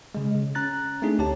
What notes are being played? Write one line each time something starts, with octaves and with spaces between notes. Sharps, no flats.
C#3 G#3
C#3
C#4 A#5 F#6 A6
A3 C4 D4 D#4 G#4
D2 G4 C#5 A5